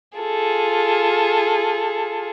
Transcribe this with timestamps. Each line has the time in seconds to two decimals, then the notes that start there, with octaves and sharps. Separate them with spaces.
0.18 F4 G#4 A4